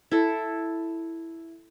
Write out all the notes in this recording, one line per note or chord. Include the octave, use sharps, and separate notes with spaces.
E4 A4